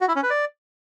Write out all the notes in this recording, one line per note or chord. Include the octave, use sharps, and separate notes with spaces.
F#4
E4
C#4
B4
D5